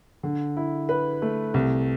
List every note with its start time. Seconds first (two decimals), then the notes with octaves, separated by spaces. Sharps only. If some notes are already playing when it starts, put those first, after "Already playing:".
0.23 D3
0.57 E4
0.89 B4
1.22 A3
1.54 C2